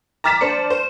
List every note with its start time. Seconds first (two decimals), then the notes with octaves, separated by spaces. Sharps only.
0.24 A#5 D6 F6 A6 B6 E7
0.41 D4 C5 D5 C#7
0.70 C5